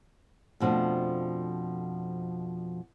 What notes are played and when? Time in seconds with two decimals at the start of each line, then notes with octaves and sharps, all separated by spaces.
0.60 F2 B2 F3 A3 D4